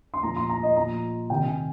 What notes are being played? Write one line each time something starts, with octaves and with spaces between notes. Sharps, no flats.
C6
A#2 F3 A#5
C6
A#5
D#5
A#2 F3 A#5
C3 D#3 G5
G#5